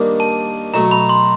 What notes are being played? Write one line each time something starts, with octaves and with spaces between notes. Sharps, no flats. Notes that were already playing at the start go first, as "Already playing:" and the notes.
Already playing: D#3 G3 A#3 D4
A5
B2 F#3 A3 A#5
B5
C6